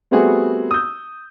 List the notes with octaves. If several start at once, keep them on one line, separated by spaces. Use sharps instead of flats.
G3 A3 B3 C4 F#4 G#4
D#6 E6 G6